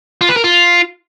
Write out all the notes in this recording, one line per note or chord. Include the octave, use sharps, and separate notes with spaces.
F4
B4
A#4
F4